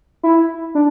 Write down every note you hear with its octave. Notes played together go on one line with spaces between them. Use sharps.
E4
D4